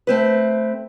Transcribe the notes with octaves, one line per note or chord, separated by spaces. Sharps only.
A3 C4 B4